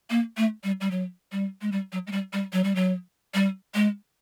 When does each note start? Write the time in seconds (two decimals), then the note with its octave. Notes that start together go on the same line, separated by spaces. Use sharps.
0.10 A#3
0.37 A3
0.64 G3
0.81 G3
0.91 F#3
1.32 G3
1.62 G#3
1.72 G3
1.92 F#3
2.07 G#3
2.12 G3
2.33 G3
2.53 F#3
2.64 G3
2.75 F#3
3.34 G3
3.75 G#3